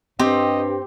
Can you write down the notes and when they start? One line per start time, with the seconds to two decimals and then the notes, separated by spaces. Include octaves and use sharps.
0.19 G2 C4 G4 D#5